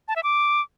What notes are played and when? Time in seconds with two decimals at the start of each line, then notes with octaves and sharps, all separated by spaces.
0.08 A5
0.16 E5
0.23 D6